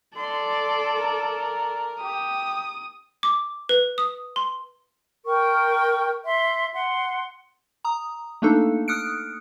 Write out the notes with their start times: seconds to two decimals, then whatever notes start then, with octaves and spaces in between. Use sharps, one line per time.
0.17 A4 D5 C6
0.97 A#4
2.02 G4 D#6
3.23 D6
3.69 B4
3.98 D#6
4.36 C6
5.25 A#4 G5 C#6
6.25 E5 C6
6.73 F#5 C6
7.85 A#5 D#6
8.42 A3 A#3 D4 D#4 A4
8.88 D#6 F6 F#6 C#7 D7